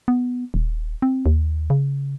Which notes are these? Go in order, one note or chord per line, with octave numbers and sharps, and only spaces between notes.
B3
D#1
C4
D#2
C#3